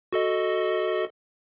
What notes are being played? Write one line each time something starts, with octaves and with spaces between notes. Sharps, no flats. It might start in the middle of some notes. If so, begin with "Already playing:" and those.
F#4 A4 D#5